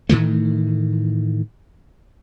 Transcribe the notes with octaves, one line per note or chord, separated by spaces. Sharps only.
A2 D#3 E3 A3